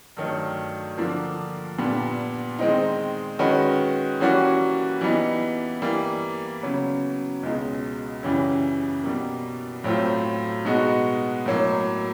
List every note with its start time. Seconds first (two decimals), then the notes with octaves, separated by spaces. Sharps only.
0.17 G2 D#3 F#3 A3
0.98 D3 F3 A#3 D4
1.78 A#2 G3 B3 D4
2.59 D#3 G#3 C4 D#4
3.39 D#3 G#3 C#4 F#4 B4
4.20 E3 G3 A#3 C#4 F#4
5.01 E3 G3 B3 D#4
5.82 E3 G3 A#3
6.63 C#3 F#3 B3
7.43 C#2 B2 G#3
8.23 F#2 C#3 E3 G3
9.04 B2 G3 A#3
9.84 A2 F#3 A3 C4 F4
10.65 B2 G#3 B3 D#4 F#4
11.46 A2 F#3 A#3